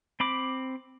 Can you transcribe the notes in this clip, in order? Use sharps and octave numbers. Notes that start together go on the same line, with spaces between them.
C4 B5 D6